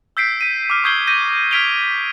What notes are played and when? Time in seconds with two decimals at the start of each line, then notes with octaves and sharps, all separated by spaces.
0.17 E6 G6 B6 C7 D7
0.41 B6 D#7
0.70 D6 F6
0.84 C#6 D#6 G6 G#6 C7 G7
1.07 G6 A#6 D#7
1.51 F6 G#6 B6 D7 F7 G7